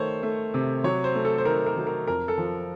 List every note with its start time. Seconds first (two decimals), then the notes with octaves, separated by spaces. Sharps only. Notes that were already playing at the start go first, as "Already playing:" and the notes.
Already playing: D#3 A3 C5 C#5
0.23 A3
0.54 C3
0.84 F#3 C#5
1.04 C5
1.15 A3
1.25 A4
1.38 C5
1.45 D#3 A#4
1.66 A#4
1.77 F#3
1.87 A#4
2.07 F2 A#4
2.28 A4
2.38 F3